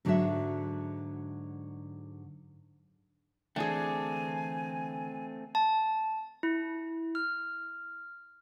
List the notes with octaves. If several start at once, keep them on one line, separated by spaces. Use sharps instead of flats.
G#2 D3 F#3 G#3 F#4 E5
D3 E3 A3 C4 D4 G#4 G5 G#5
A5
E4
F6